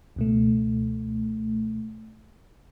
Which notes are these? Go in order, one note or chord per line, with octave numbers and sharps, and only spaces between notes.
C#2 B2 A3